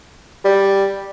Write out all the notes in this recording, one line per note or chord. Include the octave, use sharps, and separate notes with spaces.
G3